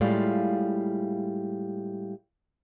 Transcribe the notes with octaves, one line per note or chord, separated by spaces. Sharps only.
A2 G3 G#3 F4 F5